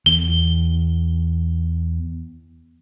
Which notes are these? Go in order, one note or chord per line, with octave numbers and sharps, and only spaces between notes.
E2 G7